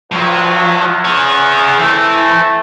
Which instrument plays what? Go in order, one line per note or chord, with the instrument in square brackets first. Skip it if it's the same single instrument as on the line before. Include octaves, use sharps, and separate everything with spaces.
[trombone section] A#1 G2 F#3 [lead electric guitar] F3
[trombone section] E2
[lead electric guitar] G#4 C#5
[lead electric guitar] E3 [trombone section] A3 C4